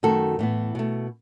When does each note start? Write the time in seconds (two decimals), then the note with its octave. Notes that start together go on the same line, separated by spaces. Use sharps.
0.03 F#2 D#3 A3 F#4 A4
0.39 A2 E3 B3
0.75 B2 A3